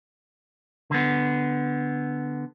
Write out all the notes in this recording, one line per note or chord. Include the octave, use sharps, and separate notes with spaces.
D3 B3